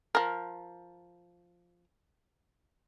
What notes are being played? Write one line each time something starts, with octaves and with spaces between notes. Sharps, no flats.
F3 A#4